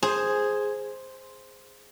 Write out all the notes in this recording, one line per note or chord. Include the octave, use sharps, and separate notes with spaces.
G#4 C5